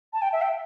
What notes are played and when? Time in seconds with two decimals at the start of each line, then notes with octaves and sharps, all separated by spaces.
0.13 A5
0.22 G5
0.33 E5
0.42 G5